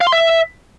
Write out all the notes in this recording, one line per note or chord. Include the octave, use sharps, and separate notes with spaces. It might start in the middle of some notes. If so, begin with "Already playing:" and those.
F5
C6
E5